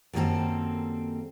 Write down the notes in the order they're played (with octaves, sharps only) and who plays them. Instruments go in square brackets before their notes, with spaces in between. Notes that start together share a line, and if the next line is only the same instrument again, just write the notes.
[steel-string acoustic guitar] F#2 D#3 G3 A#3 C4 A4